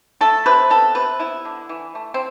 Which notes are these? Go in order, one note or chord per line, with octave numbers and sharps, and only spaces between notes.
A3 A4
C3 B4
B3 A4
C3 B4
B3 E4
D3
E3
A3
C4